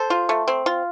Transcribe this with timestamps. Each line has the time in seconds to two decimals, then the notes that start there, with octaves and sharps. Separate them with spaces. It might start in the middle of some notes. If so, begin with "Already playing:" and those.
Already playing: A4 C5
0.10 F4
0.29 A3
0.48 C4
0.66 F4